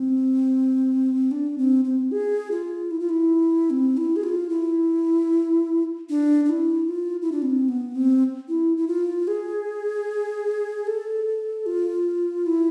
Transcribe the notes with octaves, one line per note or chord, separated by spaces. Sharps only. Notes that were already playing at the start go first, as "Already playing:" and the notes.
Already playing: C4
D4
C4
C4
G#4
F4
E4
F4
E4
C4
E4
G#4
F4
E4
D4
D4
E4
F4
E4
D4
C4
B3
C4
E4
E4
F4
G#4
A4
F4
E4